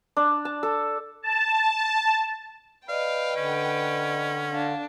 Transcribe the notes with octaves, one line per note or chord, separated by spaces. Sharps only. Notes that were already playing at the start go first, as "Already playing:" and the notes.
D4
A5
A4
A5
B4 D5 D#5 F5 G5
D3 C#4
D4 F5